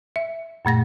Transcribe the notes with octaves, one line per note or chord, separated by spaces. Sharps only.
E5
F#2 A#2 A3 A#6